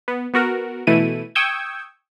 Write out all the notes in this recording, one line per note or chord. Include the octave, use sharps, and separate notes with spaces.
B3
B3 F#4 A#4
B2 E3 A3 E4 D#7
G5 C#6 D#6 E6 G6 G#6